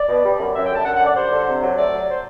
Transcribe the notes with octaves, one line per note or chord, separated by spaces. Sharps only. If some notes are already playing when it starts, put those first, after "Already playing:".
Already playing: D5
B2
G3
F#2
F#2 E5
G5
D3
A5
F#2 F#5
F#5
D3
D5
G3 C5
D3
C3
F#3
A3 D5
F#3
C5